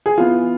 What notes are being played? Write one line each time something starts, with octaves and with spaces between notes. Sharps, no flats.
G#4
E3 B3 F4